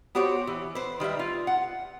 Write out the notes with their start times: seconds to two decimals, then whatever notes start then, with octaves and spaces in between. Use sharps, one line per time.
0.15 B3 F#4 G4 C5 C#5
0.47 E3
0.75 B4 C5
1.00 D#3 G3 B4 E5
1.19 F4
1.47 F#5